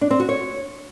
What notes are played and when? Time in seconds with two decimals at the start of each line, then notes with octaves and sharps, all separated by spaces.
0.01 D4
0.11 C4
0.20 F#4
0.29 C#5